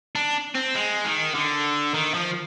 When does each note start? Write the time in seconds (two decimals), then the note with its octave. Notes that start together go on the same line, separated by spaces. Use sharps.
0.16 D4
0.55 C4
0.75 G#3
1.04 D#3
1.34 D3
1.94 D#3
2.14 F3